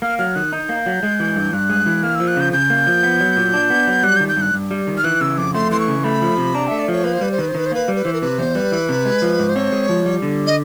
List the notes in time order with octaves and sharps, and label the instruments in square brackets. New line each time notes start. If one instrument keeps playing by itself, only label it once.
[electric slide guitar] A#3 [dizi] F6
[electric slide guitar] F#3 [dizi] F6
[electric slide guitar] D#3 [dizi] F#6
[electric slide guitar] D#4 [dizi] G6
[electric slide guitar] A#3
F#3
G#3
E3
G2
[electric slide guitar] G2 [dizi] F#6
[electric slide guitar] G#3
E3
[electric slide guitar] A#3 [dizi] F6
[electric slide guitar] F3 [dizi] E6
[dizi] F#6
[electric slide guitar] C#3 [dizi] G6
[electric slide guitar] C#3 [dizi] G6
[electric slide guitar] A#3
F3
B3
F#3
A#2
D4
B3
F#3
[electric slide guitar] G3 [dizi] F#6
[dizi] G6
[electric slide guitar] D#3
[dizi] G6
[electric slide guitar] G2 [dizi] F#6
[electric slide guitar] G2
G3
D#3
[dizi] F6
[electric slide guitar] E3 [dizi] F#6
[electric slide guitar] C#3 [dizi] E6
[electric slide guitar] F2 [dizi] D6
[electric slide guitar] A3 [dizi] C6
[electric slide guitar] E3 [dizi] C6
[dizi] C#6
[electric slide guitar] C#3
[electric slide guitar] A3 [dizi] B5
[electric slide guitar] F3
C3
[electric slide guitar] D4 [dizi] A#5
[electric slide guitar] A3 [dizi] E5
[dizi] D5
[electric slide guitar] F3 [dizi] C#5
[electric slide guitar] A#3 [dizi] B4
[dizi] C5
[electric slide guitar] G3 [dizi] B4
[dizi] C5
[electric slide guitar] D#3 [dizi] B4
[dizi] C5
[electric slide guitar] D#3 [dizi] B4
[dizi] C5
[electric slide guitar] A#3 [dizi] B4
[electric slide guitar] G3
[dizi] B4
[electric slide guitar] E3 [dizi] C5
[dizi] A#4
[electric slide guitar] C3 [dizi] B4
[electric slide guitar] E2 [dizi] C5
[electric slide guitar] G3 [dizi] B4
[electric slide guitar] E3
C3
G#3
F3
G#2
[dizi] C5
[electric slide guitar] C4 [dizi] C#5
[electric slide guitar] G#3
F3
G3
D3
[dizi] D#5